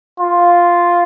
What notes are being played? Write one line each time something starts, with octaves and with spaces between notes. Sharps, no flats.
F4